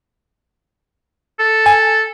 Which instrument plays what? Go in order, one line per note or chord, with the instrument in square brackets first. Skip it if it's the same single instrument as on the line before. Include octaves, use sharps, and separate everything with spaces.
[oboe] A4
[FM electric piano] G#5